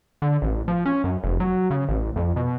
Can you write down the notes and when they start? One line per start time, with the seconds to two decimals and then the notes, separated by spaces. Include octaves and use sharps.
0.22 D3
0.42 A1
0.68 F3
0.86 C#4
1.04 F#2
1.24 F1
1.40 F#3
1.70 C#3
1.89 A1
2.16 F2
2.36 B2